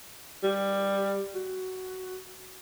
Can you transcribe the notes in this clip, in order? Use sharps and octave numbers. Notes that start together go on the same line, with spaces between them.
G3
F#4